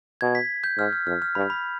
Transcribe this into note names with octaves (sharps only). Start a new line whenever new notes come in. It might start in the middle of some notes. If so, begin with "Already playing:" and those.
B2 G#6
B6
G6
G#2 F6
F6
F2 F6
F6
G2 B5
B5